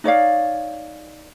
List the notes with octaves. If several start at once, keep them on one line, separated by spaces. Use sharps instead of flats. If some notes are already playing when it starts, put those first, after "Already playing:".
D#4 C#5 D5 F5